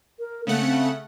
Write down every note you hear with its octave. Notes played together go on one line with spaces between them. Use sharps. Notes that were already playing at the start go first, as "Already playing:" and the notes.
A#4
C#3 A3 A#3 F#5
C4